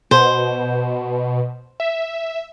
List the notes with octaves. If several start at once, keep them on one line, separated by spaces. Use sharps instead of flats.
B2 C5
E5